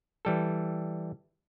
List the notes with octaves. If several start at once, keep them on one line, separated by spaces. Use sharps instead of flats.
E3 G3 A4